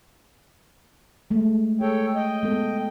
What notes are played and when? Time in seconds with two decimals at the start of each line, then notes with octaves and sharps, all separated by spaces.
1.31 G#3 A3
1.81 G#4 A4 C#5 G5
2.15 D#5 G5
2.43 G#3 B3 A4